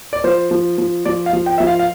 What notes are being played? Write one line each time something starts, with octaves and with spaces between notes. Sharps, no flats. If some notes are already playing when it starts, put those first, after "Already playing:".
D5
F3 C5
F3
F3
F3 D5
F5
F3
G5
F3 E5
F5
F5